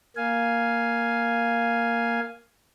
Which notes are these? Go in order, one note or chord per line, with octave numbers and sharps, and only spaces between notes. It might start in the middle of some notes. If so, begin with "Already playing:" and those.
A#3 F5 G#5